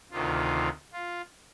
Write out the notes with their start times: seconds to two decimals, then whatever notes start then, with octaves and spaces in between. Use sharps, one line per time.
0.11 D2 C3 D#3 F4
0.93 F4